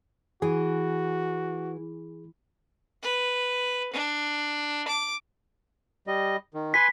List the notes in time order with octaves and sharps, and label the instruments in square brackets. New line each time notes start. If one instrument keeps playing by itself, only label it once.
[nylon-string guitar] E3 [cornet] F#4 [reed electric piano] G#4
[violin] B4
D4
D6
[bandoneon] G3 D#5
D#3
[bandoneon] B4 G#5 C6 [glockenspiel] B6